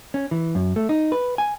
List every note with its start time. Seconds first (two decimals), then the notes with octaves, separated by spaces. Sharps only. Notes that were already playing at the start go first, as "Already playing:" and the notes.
0.14 C#4
0.31 E3
0.55 F#2
0.76 A3
0.89 D#4
1.12 B4
1.38 G#5